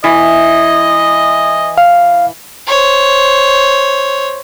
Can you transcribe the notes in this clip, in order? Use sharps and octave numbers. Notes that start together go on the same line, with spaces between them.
E3 D#5
F5
C5 C#5